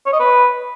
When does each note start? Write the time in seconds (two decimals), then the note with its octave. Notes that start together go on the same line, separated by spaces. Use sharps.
0.06 C#5
0.13 D#5
0.20 B4